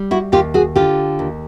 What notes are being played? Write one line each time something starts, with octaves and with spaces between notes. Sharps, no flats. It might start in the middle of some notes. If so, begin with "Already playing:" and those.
Already playing: G3
E4 F#4
D#2 F4 G4
F#4 G#4
D3 F4 G4
D#2